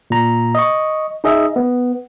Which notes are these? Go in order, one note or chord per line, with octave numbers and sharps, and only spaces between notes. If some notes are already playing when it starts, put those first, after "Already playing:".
A#2 A#5
D#5 C#6
D#4 G#4 D#5 E5
B3